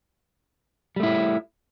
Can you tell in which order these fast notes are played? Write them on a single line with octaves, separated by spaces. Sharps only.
G3 A3 E4